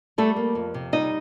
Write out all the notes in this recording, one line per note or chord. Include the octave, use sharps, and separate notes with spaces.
G3 A3 A4
A#3
F2
C3
G3 D#4 D#5